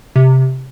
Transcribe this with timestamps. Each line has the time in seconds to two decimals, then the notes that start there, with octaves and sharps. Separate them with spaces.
0.16 C3